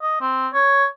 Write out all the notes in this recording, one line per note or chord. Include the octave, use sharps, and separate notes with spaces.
D#5
C4
C#5